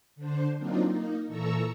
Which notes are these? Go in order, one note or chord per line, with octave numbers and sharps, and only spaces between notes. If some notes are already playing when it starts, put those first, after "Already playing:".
D3 D4 C5
F#3 A#3 C4 D4 D#4 F4
A#3 D#4
A#2 E3 A4 A#5 C#6 E6